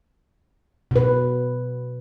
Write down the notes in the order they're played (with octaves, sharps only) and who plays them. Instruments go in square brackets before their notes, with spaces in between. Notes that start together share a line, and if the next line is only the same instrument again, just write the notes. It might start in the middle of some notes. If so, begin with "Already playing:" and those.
[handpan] B2 B4